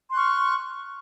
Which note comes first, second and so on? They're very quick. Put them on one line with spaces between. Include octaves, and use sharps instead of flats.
C6 F#6 C#6 F6